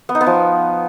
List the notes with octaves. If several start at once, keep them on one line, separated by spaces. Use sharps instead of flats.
B3
D#4
B3
F3